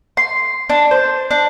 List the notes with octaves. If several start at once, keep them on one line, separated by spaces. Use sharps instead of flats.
C6
D4
C5
D4